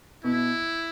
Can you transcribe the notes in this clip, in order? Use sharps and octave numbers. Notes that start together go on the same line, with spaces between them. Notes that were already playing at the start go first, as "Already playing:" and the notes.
B2 E4